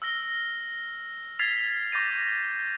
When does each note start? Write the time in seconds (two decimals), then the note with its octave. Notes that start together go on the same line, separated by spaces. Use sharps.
0.02 E6 F6 A#6 G7
1.39 F6 G#6 A6 B6 C7 F7
1.92 C#6 D6 G6 A6 A#6 D#7